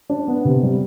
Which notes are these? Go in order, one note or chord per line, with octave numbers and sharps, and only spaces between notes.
D4
B3
C3
G3